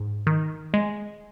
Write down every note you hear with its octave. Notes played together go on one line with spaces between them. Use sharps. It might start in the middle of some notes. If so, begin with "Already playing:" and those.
Already playing: G#2
D#3
G#3